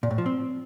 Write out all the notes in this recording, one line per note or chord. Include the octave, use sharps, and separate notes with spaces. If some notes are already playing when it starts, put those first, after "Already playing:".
A#2
A2
F3
C4